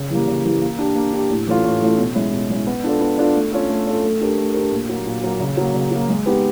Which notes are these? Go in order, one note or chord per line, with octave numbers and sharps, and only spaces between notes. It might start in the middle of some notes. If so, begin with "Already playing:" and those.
Already playing: C#3
E3 G3 A#3
C#3
E3 G3 A#3
A#3
D4 G4
A#3
D4 G4
A2
E3 A3 C#4 F4
A2
E3 A3 C#4 F4
B2
G#3 C#4 E4
B2
G#3 C#4 E4
B3
D4 F4 A4 D5
B3
D4 F4 A4 D5
A3
C#4 F4 A4
A3
C#4 F4 A4
A3
D4 G4 A#4
A3
D4 G4 A#4
A#2
F#3 A#3
A#2
F#3 A#3
C#3
F#3 A#3
C#3
F#3 A#3
G#3
B3 D#4 G4 B4